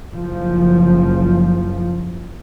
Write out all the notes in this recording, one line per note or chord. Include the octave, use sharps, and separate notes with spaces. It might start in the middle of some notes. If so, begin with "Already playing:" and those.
F#1 F3